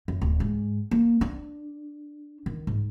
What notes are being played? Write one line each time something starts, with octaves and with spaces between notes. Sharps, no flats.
F#2
D1
G#2
A#3
D4
D#3
G#2